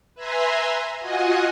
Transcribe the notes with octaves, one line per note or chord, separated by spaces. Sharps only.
B4 E5 G#5 A#5 C6
F4 F#4 D#5 F#5 G#5